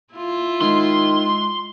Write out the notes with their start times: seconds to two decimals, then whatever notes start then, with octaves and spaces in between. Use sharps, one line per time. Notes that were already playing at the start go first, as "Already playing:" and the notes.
0.14 E4 F4
0.61 D#3 G#3 C6